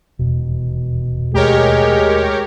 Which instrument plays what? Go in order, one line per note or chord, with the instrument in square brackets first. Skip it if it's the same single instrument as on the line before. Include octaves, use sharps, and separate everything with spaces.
[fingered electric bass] D#1 E2 [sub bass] B2
[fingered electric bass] D#2 A3 [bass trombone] G#3 [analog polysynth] G4 A#4 C#5